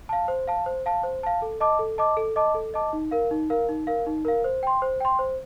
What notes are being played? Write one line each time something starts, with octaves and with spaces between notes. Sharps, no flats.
F5 A5
C5
F5 A5
C5
F5 A5
C5
F5 A5
A4
D#5 A5 D6
A4
D#5 A5 D6
A4
D#5 A5 D6
A4
D#5 A5 D6
D#4
A#4 F5
D#4
A#4 F5
D#4
A#4 F5
D#4
A#4 F5
C5
G5 C6
C5
G5 C6
C5